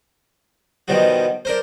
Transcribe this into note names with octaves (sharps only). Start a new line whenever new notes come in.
B2 D#3 F3 G3 F#4
D4 A#4 C5